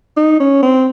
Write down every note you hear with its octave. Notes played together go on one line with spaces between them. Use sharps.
D#4
C#4
C4